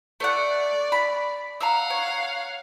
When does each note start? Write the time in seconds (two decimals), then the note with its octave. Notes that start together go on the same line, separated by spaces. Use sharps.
0.20 A3 D5 F#5
0.92 B5
1.60 F5 F#5 A#5 E6
1.90 C#5